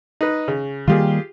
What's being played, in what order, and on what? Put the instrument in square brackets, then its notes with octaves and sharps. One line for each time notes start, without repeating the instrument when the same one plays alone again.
[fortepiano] D#4 B4
C#3
[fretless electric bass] D#3 G3 A#3 [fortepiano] F4 G4 G#4